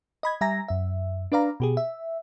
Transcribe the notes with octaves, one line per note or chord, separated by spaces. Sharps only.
D#5 B5 G#6
G3 E5 G#5 A#5 A#6
F#2 E5
D4 B4 D5 F5 A#5
B2 G4 G#4
E5